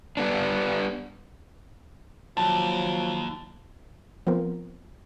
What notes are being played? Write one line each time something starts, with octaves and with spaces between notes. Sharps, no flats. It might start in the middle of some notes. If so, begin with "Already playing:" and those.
G3 B3 D4
D#2 F3 F#3 A5
F3 B3 C4 F4 A#4 C5